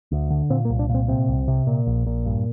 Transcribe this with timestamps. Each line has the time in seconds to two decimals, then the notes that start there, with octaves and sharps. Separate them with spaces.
0.12 D2
0.31 D3
0.50 A#2 C4
0.65 A#3
0.70 C2
0.79 D4
0.89 A#2
0.94 C4
1.08 C3 C4
1.28 C2
1.48 C3
1.67 A#2
1.86 A#1
2.07 A#2
2.25 G2